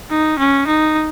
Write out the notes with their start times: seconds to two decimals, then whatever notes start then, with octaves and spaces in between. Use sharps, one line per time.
0.11 D#4
0.39 C#4
0.67 D#4